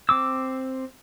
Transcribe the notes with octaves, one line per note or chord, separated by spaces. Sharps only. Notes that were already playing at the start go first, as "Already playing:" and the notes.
C4 D6 E6